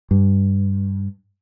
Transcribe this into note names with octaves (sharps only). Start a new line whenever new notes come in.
G2